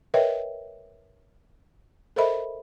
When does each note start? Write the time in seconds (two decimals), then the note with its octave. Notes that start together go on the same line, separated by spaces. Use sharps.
0.14 A#4 B4 C#5 D#5 E5 G5
2.16 A4 A#4 C5 D#5 E5 B5